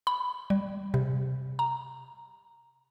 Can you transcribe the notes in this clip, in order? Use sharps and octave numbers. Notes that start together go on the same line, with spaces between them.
B5
G3
C3
A#5